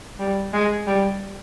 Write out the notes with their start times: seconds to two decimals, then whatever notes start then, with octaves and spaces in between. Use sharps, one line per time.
0.19 G3
0.53 G#3
0.87 G3